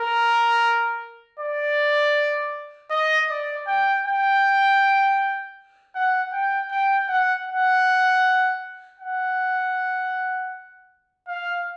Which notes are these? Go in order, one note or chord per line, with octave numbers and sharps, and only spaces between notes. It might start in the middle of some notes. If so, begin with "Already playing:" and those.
Already playing: A#4
D5
D#5
D5
G5
G5
F#5
G5
G5
F#5
F#5
F#5
F5